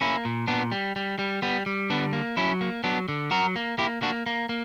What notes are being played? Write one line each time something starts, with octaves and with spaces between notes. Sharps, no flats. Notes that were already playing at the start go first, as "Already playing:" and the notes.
A#3 C#4 E4
A#2
A#2 B3 D4
G3
G3
G3
G3 B3
G3
D3 B3 D4
A#3
F#3 C#4 E4
A#3
F#3 B3 D4
D3
F#3 F#4 A#4
A#3
A#3 E4 G4
A#3 D4 F#4
A#3
A#3